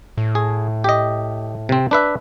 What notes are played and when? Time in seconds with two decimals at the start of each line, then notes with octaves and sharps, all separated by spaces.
0.18 A2
0.35 G#4
0.84 G4 D#5
1.69 C3 C4
1.91 D4 B4 E5